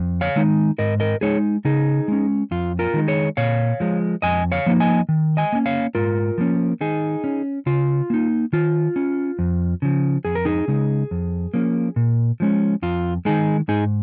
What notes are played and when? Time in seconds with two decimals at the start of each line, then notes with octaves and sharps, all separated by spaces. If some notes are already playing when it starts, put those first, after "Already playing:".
Already playing: F2
0.21 C#5 F5
0.36 D#3 G#3 D#4
0.78 G#2 A#4 D#5
1.00 A#4 D#5
1.21 G#3 D#4 G#4 C#5
1.65 C#3 D#4 G#4
2.08 G#3 C#4
2.51 F2 F4
2.79 F4 A#4
2.94 D#3 G#3 D#4
3.08 G#4 C#5
3.37 A#2 C#5 F5
3.80 F3 G#3
4.22 F2 D#5 G#5
4.52 C#5 F5
4.66 F3 A#3 D#4
4.80 D#5 G#5
5.09 D#3
5.37 D#5 G#5
5.52 A#3 C#4
5.66 C#5 F5
5.95 G#2 F4 A#4
6.38 F3 A#3 C#4
6.81 D#3 D#4 G#4
7.24 C#4
7.66 C#3 F4
8.10 A#3 D#4
8.53 D#3 F4
8.96 C#4
9.39 F2
9.82 C#3 F3
10.25 F2 G#4
10.35 A#4
10.45 D#4 G#4
10.68 C#3 G#3 D#4
11.11 F2
11.54 F3 A#3 C#4
11.96 A#2
12.40 F3 G#3 C#4
12.82 F2 F4
13.25 D#3 G#3 D#4 G#4
13.68 G#2 D#4 G#4